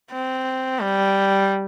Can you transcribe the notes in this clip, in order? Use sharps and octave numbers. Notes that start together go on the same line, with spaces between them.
C4
G3